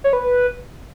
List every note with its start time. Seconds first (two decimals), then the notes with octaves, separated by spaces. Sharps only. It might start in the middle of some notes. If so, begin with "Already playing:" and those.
0.04 C#5
0.13 B4